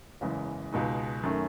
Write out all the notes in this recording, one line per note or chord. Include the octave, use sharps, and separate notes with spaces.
F#1 E2 C#3 E3 G#3
C#2 B2 G#3 D#4
F#2 D#3 A3 C#4